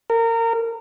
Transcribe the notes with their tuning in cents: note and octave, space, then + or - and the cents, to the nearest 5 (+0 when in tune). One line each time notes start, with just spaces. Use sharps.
A#4 -25